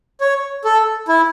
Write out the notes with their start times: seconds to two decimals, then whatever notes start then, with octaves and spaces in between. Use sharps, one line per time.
0.21 C#5
0.64 A4
1.08 E4